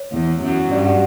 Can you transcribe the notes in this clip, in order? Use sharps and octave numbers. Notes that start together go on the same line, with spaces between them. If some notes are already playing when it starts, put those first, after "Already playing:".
Already playing: C#5
E2 E3
F#2 F#3
G2 D5
F#5